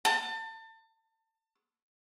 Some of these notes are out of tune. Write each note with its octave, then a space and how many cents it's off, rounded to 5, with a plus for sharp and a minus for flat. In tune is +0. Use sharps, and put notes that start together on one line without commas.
A5 +30